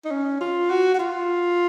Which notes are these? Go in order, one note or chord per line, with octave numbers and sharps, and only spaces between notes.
D#4
C#4
F4
F#4
F#4
F4